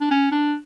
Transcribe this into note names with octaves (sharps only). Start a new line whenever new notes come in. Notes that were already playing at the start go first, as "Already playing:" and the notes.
D4
C#4
D4